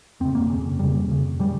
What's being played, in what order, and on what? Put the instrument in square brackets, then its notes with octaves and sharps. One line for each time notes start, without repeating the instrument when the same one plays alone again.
[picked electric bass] F2 C#3 C4
A#3
F2 C#3
F2 C#3 G3
F2 C#3
C#3 G3